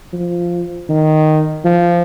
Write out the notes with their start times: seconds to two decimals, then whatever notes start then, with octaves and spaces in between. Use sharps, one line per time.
0.13 F3
0.89 D#3
1.64 F3